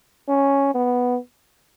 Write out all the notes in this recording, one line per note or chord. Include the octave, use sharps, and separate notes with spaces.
C#4
B3